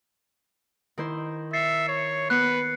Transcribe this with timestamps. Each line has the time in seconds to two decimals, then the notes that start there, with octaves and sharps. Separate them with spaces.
0.98 D#3 E4 C5
1.53 E5 A6 C7 C#7
1.89 C#5
2.30 B3 B4 F#6 C7 C#7